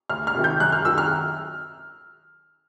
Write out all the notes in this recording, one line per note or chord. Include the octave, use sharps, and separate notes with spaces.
D2 F6
F6
C3 D#3 F#3
G6
F#2 F#6
F6
D#3 F#3 E6
F6